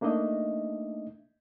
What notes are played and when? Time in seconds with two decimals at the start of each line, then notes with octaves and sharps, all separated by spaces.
0.01 A3 A#3 D4 D#4 D#5 E5